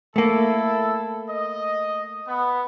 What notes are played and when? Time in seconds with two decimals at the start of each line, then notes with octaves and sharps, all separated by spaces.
0.16 A3 A#3 E4 A4
1.29 D#5
2.27 B3